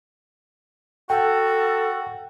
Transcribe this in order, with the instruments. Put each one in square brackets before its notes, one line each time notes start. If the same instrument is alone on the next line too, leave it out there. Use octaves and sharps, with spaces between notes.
[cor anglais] F#4 [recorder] A4 [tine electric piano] G5